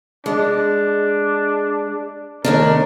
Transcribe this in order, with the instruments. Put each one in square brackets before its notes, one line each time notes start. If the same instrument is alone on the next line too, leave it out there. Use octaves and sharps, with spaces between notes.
[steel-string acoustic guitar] G#3 [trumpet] D4
[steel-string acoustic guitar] D#2 A3 D4 [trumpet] A#4